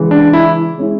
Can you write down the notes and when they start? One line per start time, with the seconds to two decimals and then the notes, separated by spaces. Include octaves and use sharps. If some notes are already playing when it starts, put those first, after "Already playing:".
Already playing: C#3 E3 G#3
0.11 D4
0.33 E4
0.78 G#3 C#4 E4